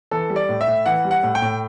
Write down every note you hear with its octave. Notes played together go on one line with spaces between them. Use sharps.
E3 A4
G3
D5
A2
E5
A2
E3 F#5
G3
F#5
A2
G5
A2